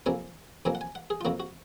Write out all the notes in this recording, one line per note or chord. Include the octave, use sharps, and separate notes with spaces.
F2 C3 F#3 A#3 G#5
F2 C3 F#3 A#3 G#5
F#5
G#5
F#5
G#4
F4
F2 C3 F#3 A#3 F#4
F#4